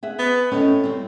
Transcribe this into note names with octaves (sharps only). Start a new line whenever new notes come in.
G#4 E5 F#5
B3
A2 C#4 D#5
G3 C4